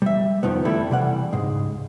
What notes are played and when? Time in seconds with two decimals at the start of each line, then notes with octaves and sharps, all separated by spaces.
0.02 G3 E5
0.43 F2 D#3 F3 B3
0.65 G3 A3 B3 E4 A4
0.90 C3 E3 G3 F#5
1.33 C#2 G#2 G#3